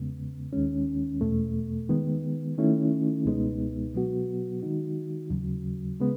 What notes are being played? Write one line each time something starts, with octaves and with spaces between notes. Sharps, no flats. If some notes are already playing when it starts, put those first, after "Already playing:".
Already playing: E2 C#3 G#3 B3
D#2 D#3 G#3 C#4
E2 B2 A3
D#3 G#3 B3
D#3 A3 C#4 E4
C#2 B2 G#3 B3 D#4
B2 F#3 B3 F#4
D#3 G#3 D#4 F#4
D#2 C#3 F#3
C#3 G#3 B3